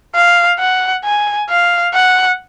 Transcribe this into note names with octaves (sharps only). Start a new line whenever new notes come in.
F5
F#5
G#5
F5
F#5